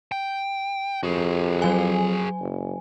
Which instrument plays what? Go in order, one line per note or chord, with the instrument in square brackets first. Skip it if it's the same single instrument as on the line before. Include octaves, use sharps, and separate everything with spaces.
[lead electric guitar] G5
[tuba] F2 [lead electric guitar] F#4 G#4
[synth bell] F#3 G#5
[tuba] F#1